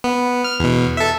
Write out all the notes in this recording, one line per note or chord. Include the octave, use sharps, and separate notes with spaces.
B3
F6
E2 B2
A4 E5